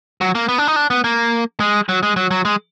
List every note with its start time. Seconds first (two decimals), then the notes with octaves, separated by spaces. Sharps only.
0.21 F#3
0.35 A#3
0.49 B3
0.58 D4
0.67 D#4
0.76 D4
0.90 B3
1.04 A#3
1.60 G#3
1.89 F#3
2.03 G#3
2.16 F#3
2.31 F#3
2.45 G#3